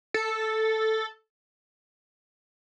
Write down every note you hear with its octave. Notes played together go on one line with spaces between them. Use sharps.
A4